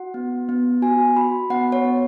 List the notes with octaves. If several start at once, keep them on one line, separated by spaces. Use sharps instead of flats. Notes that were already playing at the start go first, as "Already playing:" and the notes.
Already playing: F#4 F#5
B3
B3
F#4 G#5
F#4 B5
B3 F#5
C#5
B3